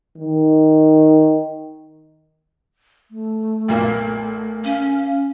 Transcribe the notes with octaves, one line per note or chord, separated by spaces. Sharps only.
D#3
A3
B1 A#2 A#3
C#4 F5